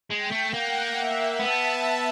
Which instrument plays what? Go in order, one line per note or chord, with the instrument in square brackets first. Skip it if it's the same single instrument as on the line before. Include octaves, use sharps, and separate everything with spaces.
[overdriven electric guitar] G#3 [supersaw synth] G5
[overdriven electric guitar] A3
[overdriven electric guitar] A#3 [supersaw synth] F#5
[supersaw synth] E5
[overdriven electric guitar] B3 [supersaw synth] A5